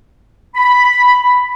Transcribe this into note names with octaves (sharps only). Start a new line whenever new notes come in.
B5